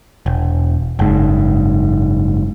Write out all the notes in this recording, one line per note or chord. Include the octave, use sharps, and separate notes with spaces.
E1
F#1 G#2